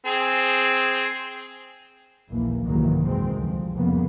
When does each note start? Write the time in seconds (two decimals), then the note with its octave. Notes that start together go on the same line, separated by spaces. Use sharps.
0.06 C4 G#4
2.30 A#1 D#2 E3 A#3
2.65 C2 G#2 D#3 E3 F#3 A#3
3.04 F#2 D#3 E3 G#3 C4
3.34 D2 F3
3.75 C2 F2 C#3 F3 A#3 B3